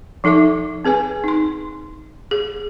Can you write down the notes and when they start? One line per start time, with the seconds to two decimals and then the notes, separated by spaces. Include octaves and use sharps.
0.24 F3 D#4 A4 E5 D6
0.85 C4 G#4 B4 G#5
1.24 D#4 C6
2.31 G#4